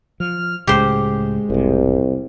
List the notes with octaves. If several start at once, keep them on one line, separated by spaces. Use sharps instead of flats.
F3 F6
C#2 A2 C#3 G#3 G4 C5
E1 C2 G#2 C3